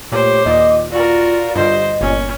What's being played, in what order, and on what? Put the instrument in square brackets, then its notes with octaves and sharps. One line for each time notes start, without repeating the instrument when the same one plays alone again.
[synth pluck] A#2 [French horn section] A3 G4 C#5 [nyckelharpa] C5 [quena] D6
[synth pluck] D#2 A#2 [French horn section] D#5
[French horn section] F4 [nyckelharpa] F#4 A#4 [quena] D5
[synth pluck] G2 D3 [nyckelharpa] C5 [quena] D#5
[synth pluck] G1 A#2 [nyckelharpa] C#4